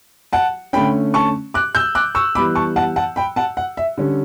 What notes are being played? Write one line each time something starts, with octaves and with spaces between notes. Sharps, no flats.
F#5 A5
D3 A3 C#4 G5 B5
A5 C#6
D6 F#6
E6 G6
D6 F#6
C#6 E6
E3 G3 B3 B5 D6
A5 C#6
F#5 A5
F#5 A5
G5 B5
F#5 A5
F#5
E5
D3 G3 C#4